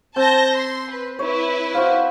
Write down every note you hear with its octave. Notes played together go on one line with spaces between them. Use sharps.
C4 A5 G6 A#6
C6
B4
E4 B4 C#5
F#4 C5 F5